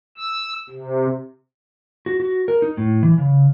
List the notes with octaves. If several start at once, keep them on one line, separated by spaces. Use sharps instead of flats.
E6
C3
F#4
F#4
A#4
D#4
A2
E3
C#3